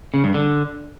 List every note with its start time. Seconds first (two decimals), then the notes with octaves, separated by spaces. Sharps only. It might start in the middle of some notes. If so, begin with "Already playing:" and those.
0.14 C#3
0.24 G2
0.34 D3